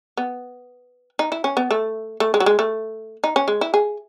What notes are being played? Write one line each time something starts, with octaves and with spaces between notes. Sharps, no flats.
B3
D#4
E4
C#4
B3
A3
A3
G#3
F#3
G#3
A3
D#4
C#4
G#3
E4
G#4